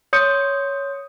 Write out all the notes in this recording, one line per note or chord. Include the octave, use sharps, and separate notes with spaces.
C#5 C6 D#6 G6 C#7